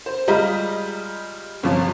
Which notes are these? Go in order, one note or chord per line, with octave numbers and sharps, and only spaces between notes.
C5
G3 G#3 F4 D#5 A#5 B6
G1 C3 F3